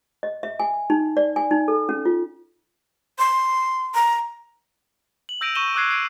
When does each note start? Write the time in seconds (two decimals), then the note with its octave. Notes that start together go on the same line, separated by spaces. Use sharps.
0.23 D#5
0.43 E5
0.60 G#5
0.90 D#4
1.17 D5
1.36 G#5
1.51 D#4
1.68 A4
1.89 C#4
2.05 F4
3.19 C6
3.95 A#5
5.29 F#7
5.41 E6 G6 A#6 D7 D#7 F7
5.55 C#6 G6 A#6 D#7 E7 G7
5.75 D6 E6 F#6 G#6 C7
5.91 C7 D7 D#7